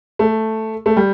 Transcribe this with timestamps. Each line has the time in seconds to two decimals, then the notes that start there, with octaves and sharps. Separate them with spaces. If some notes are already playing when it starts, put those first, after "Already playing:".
0.19 A3
0.86 A3
0.97 G3